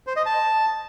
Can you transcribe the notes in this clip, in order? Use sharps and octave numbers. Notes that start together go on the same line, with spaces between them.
C5
D#5
A5